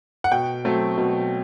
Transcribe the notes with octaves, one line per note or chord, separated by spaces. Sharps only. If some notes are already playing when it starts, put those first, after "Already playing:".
F#5
B2 G5
F#3 A3 C4
B2